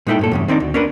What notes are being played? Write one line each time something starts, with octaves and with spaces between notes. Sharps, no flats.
A#2 G#3 D#4 E4 A4 G5
G2 A#2 A4
E2 G2 C#3
D#3 C4 D4 D#4
D2
C#4 D4 A#4 B4